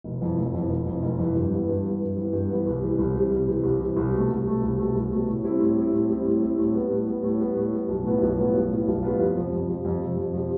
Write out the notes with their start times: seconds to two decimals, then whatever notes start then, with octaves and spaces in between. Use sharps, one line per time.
0.04 F1
0.21 F2 E3
0.37 F1
0.54 F2 E3
0.69 F1
0.86 F2 E3
1.02 F1
1.19 F2 E3
1.35 G2
1.51 E3 B3
1.68 G2
1.84 E3 B3
2.01 G2
2.17 E3 B3
2.33 G2
2.49 E3 B3
2.66 C2
2.82 C3 E3 G3
2.98 C2
3.15 C3 E3 G3
3.31 C2
3.47 C3 E3 G3
3.63 C2
3.80 C3 E3 G3
3.96 C2
4.13 B2 A3
4.29 C2
4.45 B2 A3
4.62 C2
4.79 B2 A3
4.94 C2
5.11 B2 A3
5.27 A2
5.43 G3 C4 E4
5.60 A2
5.76 G3 C4 E4
5.92 A2
6.09 G3 C4 E4
6.25 A2
6.42 G3 C4 E4
6.58 A2
6.74 G3 B3
6.90 A2
7.07 G3 B3
7.23 A2
7.39 G3 B3
7.56 A2
7.73 G3 B3
7.88 B1
8.05 A2 G3 B3 F4
8.21 B1
8.37 A2 G3 B3 F4
8.54 B1
8.70 A2 G3 B3 F4
8.87 B1
9.02 A2 G3 B3 F4
9.20 F2
9.36 C3 F3
9.52 F2
9.68 C3 F3
9.85 F2
10.01 C3 F3
10.17 F2
10.33 C3 F3